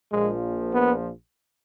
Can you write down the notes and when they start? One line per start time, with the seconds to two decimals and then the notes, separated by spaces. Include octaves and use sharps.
0.11 A#1 A#2 F3 G#3
0.73 B3